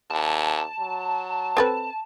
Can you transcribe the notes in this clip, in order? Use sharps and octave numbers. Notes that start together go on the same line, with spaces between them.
D#2 A5
F#3
C4 A4 B4